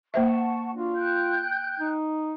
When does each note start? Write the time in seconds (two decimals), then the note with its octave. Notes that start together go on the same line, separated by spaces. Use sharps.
0.14 A#3 C5 E5 F#5 A5 C#6
0.74 D4 F4 F#4
0.95 G5 F#6 G6
1.80 D#4